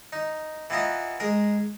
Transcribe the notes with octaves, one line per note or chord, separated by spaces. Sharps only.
D#4
E3 B3 F4 D#5 A#5
G#3 G#4 A#4